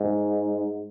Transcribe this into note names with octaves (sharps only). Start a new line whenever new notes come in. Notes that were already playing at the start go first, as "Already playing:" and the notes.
Already playing: G#2